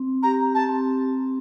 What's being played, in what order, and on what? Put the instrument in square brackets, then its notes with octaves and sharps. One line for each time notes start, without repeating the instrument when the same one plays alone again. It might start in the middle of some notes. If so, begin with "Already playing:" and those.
Already playing: [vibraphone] C4
[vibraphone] G4 [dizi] A#5
[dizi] A5
[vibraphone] C4